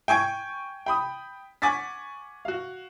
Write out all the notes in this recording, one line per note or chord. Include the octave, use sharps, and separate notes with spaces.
G5 G#5 C#6 G#6 D7
G5 B5 D#6
F#5 G#5 C#6 D6 A6 B6
F#4 F5